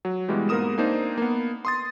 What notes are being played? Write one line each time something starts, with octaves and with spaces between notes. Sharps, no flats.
F#3
B2 E3 G3 G#3 G4
G#2 A#3 B3 A#4 D#6 E7
A#3 C4 D4 D#4 C5
A#3 B3
C6 D#6 A6